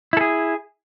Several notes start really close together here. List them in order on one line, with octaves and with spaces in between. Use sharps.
E4 A4 G#4